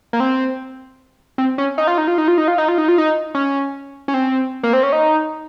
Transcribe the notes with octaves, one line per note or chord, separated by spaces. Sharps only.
A#3
C4
C4
C#4
D#4
F4
D#4
F4
D#4
F4
D#4
F4
D#4
F4
D#4
F4
D#4
C#4
C#4
C4
A#3
C4
C#4
D#4